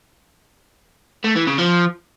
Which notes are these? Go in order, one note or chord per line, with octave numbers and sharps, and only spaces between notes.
A3
E3
C#3
F3